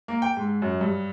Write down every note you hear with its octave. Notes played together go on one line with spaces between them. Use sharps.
A#3
G5
G#2
F#2
G2